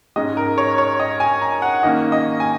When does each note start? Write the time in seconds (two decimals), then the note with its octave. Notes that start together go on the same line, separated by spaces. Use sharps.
0.16 G#2 G#3 C#4 D#5
0.37 A#4
0.58 C#5
0.78 C#5
1.00 D#5
1.20 G#5
1.42 A#5
1.62 F#5
1.83 D#3 A#3 C#4 D#5
2.12 D#5
2.40 G#5